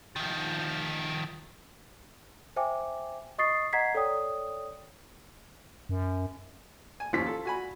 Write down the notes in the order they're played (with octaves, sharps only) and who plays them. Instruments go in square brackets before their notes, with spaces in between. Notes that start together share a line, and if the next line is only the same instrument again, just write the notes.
[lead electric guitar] D#3 F3
[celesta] C5 E5 G5 G#5 D6
D#5 C#6 D#6 A6 C7
D#5 F#5 A#5 G#6 B6 C7
A4 C#5 D5 G5 D#6
[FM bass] F#2
[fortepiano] G#5
[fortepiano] D#2 F3 C#4 [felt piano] F4 B6
[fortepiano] A4
F#4 G#5 B5